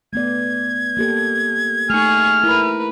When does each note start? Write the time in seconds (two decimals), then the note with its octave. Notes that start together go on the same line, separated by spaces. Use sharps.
0.13 A3 B3 D5 G#6
0.97 A#3 G4 A4
1.90 A3 D#4 G#4 C#6 F6
2.44 E4 A#4 B4